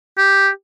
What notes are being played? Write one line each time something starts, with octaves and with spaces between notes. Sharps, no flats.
G4